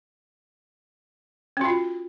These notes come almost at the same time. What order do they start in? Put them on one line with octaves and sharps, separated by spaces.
C#4 F#4 F4